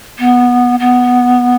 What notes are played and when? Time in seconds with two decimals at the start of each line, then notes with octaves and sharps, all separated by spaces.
0.19 B3
0.79 B3